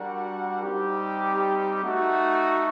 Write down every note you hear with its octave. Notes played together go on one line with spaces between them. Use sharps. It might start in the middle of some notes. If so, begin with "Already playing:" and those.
Already playing: G3 D4 F#4 A#4 F#5
G3 C4 D#4 G4
A3 D#4 F#4